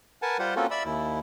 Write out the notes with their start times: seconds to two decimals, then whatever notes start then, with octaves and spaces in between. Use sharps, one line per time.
0.22 A#4 B4 F#5 G#5 A5
0.39 G3 F4 G4 C5 F#5
0.56 A#3 C4 C#4 F4 F#4 A4
0.71 D5 E5 B5 E6
0.85 D#2 E4